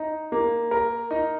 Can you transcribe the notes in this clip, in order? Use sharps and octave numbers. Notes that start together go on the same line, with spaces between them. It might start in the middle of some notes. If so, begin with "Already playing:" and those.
Already playing: D#4
A#3
A#4
D#4